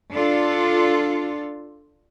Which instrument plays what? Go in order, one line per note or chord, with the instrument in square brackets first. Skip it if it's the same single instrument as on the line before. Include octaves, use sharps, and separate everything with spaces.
[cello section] D4 F4 A4